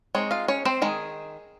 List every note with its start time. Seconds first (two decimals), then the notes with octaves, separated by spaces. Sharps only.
0.15 G#3 C4 D#4 C#5
0.31 F4 F5
0.48 C#4 C#5
0.65 C4 C5
0.82 D#3 G#3 G#4